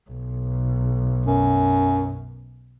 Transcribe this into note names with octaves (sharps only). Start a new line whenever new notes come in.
B1
F#2